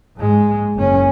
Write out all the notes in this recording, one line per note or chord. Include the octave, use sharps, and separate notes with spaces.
G#2 G#3
F#1 C#4